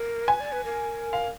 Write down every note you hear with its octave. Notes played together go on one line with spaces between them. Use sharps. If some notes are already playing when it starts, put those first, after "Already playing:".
Already playing: A#4
B4 G#5
D5
B4
A#4
F5